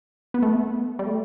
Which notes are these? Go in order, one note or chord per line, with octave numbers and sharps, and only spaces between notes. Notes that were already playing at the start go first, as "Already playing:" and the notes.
B3
A3
B3
G3
A3